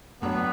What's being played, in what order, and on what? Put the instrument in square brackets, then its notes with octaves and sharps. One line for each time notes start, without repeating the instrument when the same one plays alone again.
[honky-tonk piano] A2 F#3 D4 [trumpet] B3